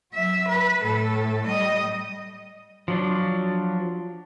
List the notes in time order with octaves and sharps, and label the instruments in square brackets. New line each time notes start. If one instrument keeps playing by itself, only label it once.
[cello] F#3 E5
B4
A2 A4
G3 D#5
[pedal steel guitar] F3 F#3 D4